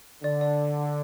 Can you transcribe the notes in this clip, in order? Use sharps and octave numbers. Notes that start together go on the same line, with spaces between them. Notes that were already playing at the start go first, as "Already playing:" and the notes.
D3 D5
D5